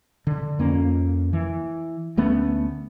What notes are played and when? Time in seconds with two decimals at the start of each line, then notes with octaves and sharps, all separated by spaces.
0.27 D3
0.59 F2 A#3 C#4
1.33 E3
2.17 D2 A3 B3 C#4